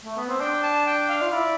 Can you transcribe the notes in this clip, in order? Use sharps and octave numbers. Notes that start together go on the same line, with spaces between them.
A3
B3
C4
D4 G5
A5
G5
F5
F4
E4 D5